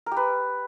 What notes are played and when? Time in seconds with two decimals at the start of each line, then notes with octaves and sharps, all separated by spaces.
0.06 A#4
0.11 G4
0.17 B4